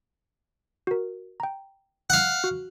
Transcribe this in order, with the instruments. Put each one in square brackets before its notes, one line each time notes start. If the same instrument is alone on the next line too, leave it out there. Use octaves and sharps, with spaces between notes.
[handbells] F#4 A#4
G5 A#5
[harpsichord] F5 F#5
[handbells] F#4